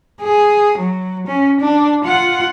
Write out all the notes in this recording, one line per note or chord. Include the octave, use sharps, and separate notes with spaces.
G#4
F#3
C#4
D4
F4 F#5